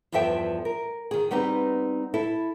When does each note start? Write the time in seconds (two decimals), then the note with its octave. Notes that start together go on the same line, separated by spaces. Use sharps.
0.12 E2 G2 F3 A4 E5 G5
0.65 A#4
1.11 D#3 G#4
1.31 G3 B3 C4 D#4
2.14 E4 A4